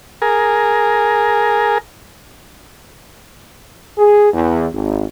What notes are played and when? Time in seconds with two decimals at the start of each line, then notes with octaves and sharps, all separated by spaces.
0.22 G#4 A#4
3.98 G#4
4.33 E2
4.73 G#1